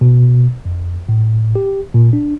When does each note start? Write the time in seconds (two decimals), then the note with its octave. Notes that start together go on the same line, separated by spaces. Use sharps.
0.01 B2
0.65 F2
1.09 A2
1.55 G4
1.94 A#2
2.13 D4